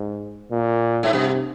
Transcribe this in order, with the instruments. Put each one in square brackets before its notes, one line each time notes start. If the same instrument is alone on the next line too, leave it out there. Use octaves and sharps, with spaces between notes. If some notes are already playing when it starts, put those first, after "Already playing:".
Already playing: [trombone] G#2
A#2
[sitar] G#2
[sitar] G2 [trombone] C3